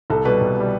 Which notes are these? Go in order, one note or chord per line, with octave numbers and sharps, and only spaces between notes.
C2 A4
B2 G3 B4
C2
B2 G3